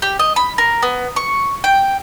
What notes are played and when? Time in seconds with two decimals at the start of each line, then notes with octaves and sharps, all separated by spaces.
0.02 G4
0.19 D#5
0.36 B5
0.58 A#4
0.82 B3
1.16 C#6
1.64 G5